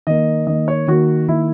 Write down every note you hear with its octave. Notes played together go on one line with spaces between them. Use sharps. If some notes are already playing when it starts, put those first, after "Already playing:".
D#3 A#3 D#5
D#3 A#3 D#5
C#5
D#3 A#3 F#4
D#3 A#3 E4